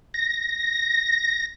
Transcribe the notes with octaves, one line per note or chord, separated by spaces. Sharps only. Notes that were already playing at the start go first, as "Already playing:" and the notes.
A#6